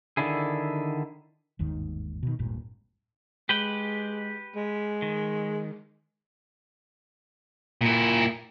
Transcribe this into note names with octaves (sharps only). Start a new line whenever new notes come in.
D3 D#3 D4 E4 G#4
G1 D#2 G#2 D#3
B2 D#3
D#1 G#1 G2 A#2
G#3 G4 B4 G5
G#3
D#3
A#2 E4